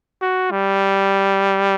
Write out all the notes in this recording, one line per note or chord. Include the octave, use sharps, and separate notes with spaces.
F#4
G3